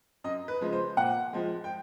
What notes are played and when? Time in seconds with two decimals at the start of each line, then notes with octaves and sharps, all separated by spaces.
0.24 F#2 D#5
0.48 B4
0.60 C#3 F3 G#3
0.72 C5
0.97 A#2 F#5
1.33 F3 G#3
1.64 G5